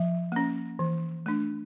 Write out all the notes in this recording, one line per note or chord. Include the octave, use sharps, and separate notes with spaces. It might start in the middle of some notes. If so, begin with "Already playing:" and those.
Already playing: F3 E5
A#3 C#4
E3
A3 D4